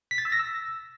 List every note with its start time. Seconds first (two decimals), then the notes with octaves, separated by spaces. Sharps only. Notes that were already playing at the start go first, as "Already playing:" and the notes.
0.11 B6
0.18 A6
0.25 E6
0.32 A#6
0.39 E6